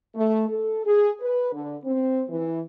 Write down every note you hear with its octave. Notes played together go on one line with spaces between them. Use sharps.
A3
A4
G#4
B4
D3
C4
E3